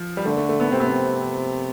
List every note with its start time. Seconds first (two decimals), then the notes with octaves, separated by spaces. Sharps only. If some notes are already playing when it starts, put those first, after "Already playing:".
Already playing: F3
0.17 G3
0.25 D3 A3
0.37 A3
0.49 A3
0.60 B3
0.72 C3 C4
0.80 B3
0.87 C4